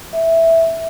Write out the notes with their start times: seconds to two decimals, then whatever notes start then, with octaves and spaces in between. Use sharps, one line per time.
0.13 E5